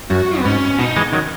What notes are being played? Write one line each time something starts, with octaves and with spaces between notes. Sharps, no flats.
F#2 F#4
B3
G#2 C#4
B2 D#4
E3 G#3
D#3 F#3